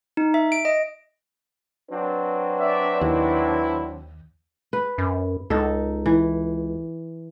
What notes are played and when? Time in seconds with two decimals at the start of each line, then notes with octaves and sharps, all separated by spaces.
0.17 D#4
0.34 E5
0.52 D7
0.65 D#5
1.90 F#3 C4 D4 B4
2.59 D5 E5
3.01 D#2 E4
4.73 B4
4.98 F#2
5.50 C#2 D#4 A4
6.06 E3